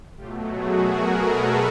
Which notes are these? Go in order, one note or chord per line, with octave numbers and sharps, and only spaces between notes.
B2 F#3 A3 F4 G4
F#4 G#4
G#4 A#4
A4 B4